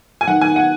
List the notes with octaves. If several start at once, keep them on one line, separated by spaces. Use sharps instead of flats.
G#5
D#3 F#5
D#3 G#5
F#5